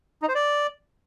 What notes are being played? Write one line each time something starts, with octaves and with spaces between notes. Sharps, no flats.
D#4
C5
D5